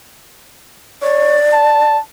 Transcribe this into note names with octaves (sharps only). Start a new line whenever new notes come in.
C#5 D5
A5